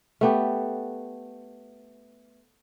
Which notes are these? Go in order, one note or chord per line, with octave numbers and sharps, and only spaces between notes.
A3 B3 G4